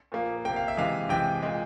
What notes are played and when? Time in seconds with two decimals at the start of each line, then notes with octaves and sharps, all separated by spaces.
0.12 A#2 F3 A#3
0.45 C3 F3 A#3 G5
0.56 F5
0.68 E5
0.77 C3 E3 G#3 F5
1.09 C3 E3 G#3 G5
1.43 A#2 G#3